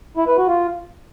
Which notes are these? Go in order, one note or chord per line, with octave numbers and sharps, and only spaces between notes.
E4
B4
F#4
F4